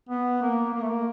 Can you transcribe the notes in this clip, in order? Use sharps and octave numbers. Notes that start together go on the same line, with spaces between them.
B3
A#3
A#3
A3
A#3